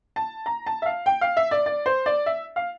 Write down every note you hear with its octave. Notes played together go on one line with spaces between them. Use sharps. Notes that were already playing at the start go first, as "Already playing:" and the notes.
A5
A#5
A5
E5
F5
G5
F5
E5
D5
D5
C5
D5
E5
F5